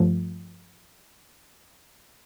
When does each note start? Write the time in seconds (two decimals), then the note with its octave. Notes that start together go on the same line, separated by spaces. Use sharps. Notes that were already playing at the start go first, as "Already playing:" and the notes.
Already playing: G2 F3 A3